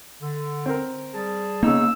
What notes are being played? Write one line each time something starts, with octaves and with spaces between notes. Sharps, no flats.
D3
C4 A#4
G3 G#4 A5
C#3 A#3 B3 D#4 E6